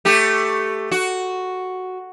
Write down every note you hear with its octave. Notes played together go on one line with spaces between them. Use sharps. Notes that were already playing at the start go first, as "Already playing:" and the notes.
A3 G4
F#4